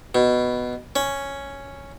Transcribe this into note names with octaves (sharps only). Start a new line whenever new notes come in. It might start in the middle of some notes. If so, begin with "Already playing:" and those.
B2
C#4